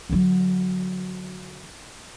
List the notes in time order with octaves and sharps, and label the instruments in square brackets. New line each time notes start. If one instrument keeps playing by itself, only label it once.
[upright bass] D3 F#3